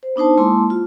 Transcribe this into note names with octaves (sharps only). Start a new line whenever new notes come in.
C5
B3 D4 D#4 C5 A5
G#3 A#3 E4 A5 C6 D6
F4